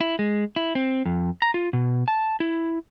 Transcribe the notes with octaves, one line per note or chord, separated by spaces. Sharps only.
E4
G#3
E4
C4
F2
A#5
F4
B2
A5
E4